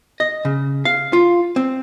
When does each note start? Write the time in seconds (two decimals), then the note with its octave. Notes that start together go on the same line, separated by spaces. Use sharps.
0.20 D#5
0.45 C#3
0.85 F5
1.13 F4
1.56 C4